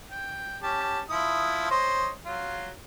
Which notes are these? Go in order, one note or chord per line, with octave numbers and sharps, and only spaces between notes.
G5
C#4 G4 A5
F3 E4 D#6
C5 C#5 D#5
F#3 F4